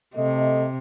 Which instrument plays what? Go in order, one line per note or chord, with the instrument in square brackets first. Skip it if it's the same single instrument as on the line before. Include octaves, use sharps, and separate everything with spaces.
[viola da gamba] C3 [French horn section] A3 A4 D#5